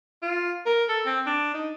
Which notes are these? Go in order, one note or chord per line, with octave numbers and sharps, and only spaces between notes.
F4
A#4
A4
C4
D4
D#4